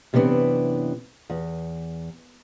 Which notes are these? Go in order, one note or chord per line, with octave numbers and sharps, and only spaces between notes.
F#2 C3 E3 A3 B3 D4
E2